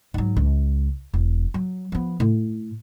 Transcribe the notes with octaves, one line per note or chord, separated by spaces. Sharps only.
G#2 F#3
C#2
E1
F#3
F3 B3
A2